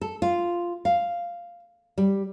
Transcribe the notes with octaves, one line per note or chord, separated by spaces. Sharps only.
A4
F4
F5
G3